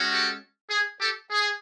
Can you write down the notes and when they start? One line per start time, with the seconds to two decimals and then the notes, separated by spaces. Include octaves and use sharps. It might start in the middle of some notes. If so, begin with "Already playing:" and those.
Already playing: G#3 C#4 F#4
0.10 G4 A4
0.70 G#4
1.00 G4 A4
1.31 G#4